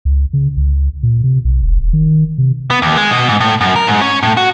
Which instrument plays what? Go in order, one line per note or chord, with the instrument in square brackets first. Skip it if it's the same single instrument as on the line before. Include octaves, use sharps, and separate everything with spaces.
[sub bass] C#2
C#3
C#2
A#2
C3
B1
E1
E1
D#3
C3
[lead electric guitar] B3
D#2
G#3
B2
G#2
A2
F#2
A#4
G#2
C#4
A2
F#4